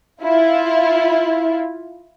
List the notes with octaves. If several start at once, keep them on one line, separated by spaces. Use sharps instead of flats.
E4 F4